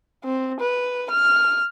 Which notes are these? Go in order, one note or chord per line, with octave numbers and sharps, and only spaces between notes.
C4
B4
F6